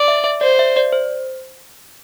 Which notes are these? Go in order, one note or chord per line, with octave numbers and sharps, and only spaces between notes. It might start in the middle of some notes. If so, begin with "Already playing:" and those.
Already playing: D5
E5
E5
C5 D5
E5
D5
C5